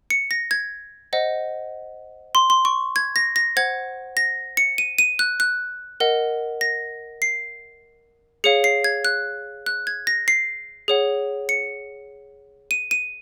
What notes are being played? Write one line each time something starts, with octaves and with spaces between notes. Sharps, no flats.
C#7
A#6
G#6
C5 D#5 F#5
C6
C6
C#6
G#6
A#6
A#6
C5 F#5 G#6
A#6
C#7
D#7
D#7
F#6
F#6
A#4 D#5 F#5
A#6
C7
G#4 C#5 F5 C#7
C7
G#6
F#6
F#6
G#6
A#6
C7
G#4 C#5 F#5
C#7
D#7
D#7